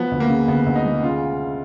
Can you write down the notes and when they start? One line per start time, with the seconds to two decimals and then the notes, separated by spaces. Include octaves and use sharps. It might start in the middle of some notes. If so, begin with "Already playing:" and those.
Already playing: F3 B3
0.11 D2
0.20 A#3
0.29 C#3
0.48 D2 B3
0.66 D2
0.75 D#4
0.85 G#3
1.03 C#3 F4